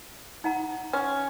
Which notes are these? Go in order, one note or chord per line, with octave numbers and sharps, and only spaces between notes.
D#4 F#5 A#5
C#4